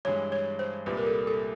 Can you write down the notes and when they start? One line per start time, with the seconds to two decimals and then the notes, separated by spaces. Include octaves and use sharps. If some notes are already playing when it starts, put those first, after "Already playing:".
0.05 G2 E3 G#3 C#5
0.32 C#5
0.59 C5
0.86 C2 A#2 G3 B4
0.97 A#4
1.07 A4
1.27 A4